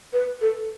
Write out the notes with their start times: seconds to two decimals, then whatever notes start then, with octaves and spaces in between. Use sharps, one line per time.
0.13 B4
0.41 A4